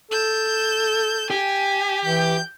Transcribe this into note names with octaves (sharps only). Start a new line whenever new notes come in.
A4 G6 E7
G4 G#5
E3 G6